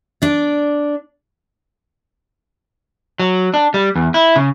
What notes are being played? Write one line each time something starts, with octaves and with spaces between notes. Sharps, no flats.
D4 D5
F#3
D4
G3
E2
E4
C#3